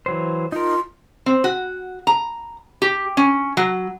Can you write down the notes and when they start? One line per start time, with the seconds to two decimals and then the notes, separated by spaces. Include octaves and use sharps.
0.06 E3 F#3 C5
0.52 D#4 F4 A#4
1.26 C4
1.44 F#4
2.07 A#5
2.82 G4
3.17 C#4
3.57 F#3